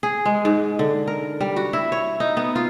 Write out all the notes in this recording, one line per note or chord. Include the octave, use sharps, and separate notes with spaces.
G#4
G#3
G#2
D3
A#4
G3
F#4
E4
C#5
D#4
B3
F4